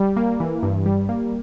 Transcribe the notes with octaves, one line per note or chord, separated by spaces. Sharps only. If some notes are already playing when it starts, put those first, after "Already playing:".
Already playing: G3
A#3
E3
G2
G3
A#3